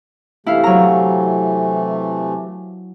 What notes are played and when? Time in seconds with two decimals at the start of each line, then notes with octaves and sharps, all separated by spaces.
0.46 C3 E3 A3 E4 F5
0.64 F#3 A#5